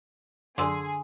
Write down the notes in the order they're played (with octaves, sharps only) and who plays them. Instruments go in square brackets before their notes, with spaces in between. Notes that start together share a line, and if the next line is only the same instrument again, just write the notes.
[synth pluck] F#2 [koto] D3 [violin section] G#4 [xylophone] C6 E6